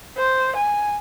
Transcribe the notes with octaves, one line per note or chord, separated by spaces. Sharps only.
C5
G#5